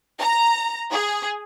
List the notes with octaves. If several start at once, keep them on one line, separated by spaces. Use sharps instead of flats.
A#5
G#4